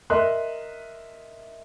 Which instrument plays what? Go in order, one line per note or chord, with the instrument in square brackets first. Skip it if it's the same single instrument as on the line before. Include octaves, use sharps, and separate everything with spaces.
[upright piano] A#4 D#5 E5 C6 F#6